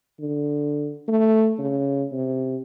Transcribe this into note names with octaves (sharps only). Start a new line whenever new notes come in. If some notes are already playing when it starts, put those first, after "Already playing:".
D3
A3
C#3
C3